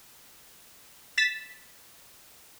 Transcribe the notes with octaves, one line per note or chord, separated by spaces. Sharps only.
A6 B6 E7